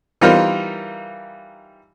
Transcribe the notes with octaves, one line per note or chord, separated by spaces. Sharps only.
E3 G3 D#4 F4 A#4 C5